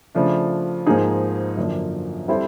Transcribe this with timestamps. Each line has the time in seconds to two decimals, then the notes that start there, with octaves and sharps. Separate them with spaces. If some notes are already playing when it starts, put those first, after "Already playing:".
0.15 C#3 F3 A3 D4
0.86 G#2 F3 A#3 D#4 G#4
1.57 F#2 D3 F3 A#3 D4
2.28 G3 C4 E4 A4 C5